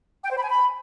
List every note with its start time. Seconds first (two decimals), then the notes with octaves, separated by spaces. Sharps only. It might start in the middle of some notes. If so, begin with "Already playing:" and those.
0.24 G5
0.31 C5
0.37 B5
0.43 G#5
0.49 B5